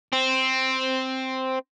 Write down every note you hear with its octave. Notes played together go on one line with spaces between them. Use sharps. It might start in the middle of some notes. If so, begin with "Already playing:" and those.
C4